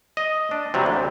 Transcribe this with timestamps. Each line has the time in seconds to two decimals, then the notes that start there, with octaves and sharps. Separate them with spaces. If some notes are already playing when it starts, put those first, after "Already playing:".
0.17 D#5
0.51 D4
0.74 C3 F#3 G3
0.86 D2